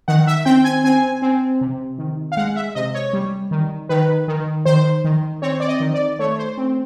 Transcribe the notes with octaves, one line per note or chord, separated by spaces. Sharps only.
D#3 F#5
E5
C4 G5
G#5
C4 G#5
C4
C3
D#3
F5
G#3 F#5
E5
C3 D#5
C#5
G3
D#3
D#3 B4
D#3
D#3 C5
D#3
C4 C#5
D5
D#5
D#3
D5
A3 C#5
C5
C4